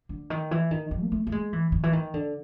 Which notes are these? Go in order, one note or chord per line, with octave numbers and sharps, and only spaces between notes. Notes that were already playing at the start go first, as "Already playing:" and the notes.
D3
D#3
E3
D#3
D#3
A#3
A3
A3
G#3
E3
D#3
E3
D#3
D3